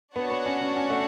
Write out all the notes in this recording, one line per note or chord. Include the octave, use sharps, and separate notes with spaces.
B3 D4 F#4 C#5 F#5 A5
B3
C#4
C#4
C#4
A3